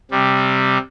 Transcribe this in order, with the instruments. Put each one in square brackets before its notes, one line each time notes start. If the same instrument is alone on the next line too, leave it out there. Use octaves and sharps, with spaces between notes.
[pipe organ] C3 G3